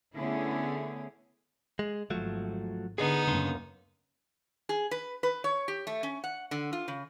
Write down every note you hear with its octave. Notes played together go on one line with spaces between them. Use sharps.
D3 A3 B3 C#4 E4 G#4
G#3
G#1 F3 F#3 A3
D3 B3 D#4 G#4 D#5
F#2 C#3 A#3 D4 C6
G#4
B4
B4
C#5
G4
A3
C#4
F#5
D3
F4
C#3